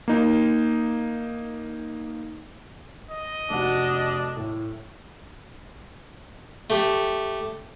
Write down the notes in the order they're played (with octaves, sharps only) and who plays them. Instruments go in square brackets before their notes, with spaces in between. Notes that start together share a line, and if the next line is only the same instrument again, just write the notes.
[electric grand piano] A#3 D#4
[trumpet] D#5
[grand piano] F1 F#4 [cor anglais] D4
[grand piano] A2
[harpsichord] A3 G4